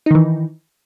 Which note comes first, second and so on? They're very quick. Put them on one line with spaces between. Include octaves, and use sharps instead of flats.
D#4 D#3 E3